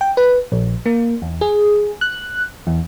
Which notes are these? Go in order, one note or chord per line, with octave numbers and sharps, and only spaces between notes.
G5
B4
A#1
A#3
E2
G#4
F#6
E2